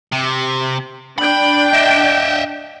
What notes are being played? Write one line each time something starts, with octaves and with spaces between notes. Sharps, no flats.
C3
D4 G5 B5
D#5 E5